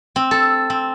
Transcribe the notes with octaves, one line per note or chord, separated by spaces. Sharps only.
C4
A4
C4